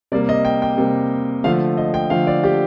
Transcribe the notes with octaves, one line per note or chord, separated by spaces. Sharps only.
C3 G3 A#3 D5
D#5
G5
G5
C3 G3 A#3
D3 F3 A3 F5
D#5
G5
D3 F3 A3 F5
D5
G4